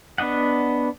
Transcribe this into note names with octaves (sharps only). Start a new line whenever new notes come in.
B3 D4 D#5 F#5